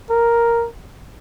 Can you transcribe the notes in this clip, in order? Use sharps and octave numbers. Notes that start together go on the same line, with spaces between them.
A#4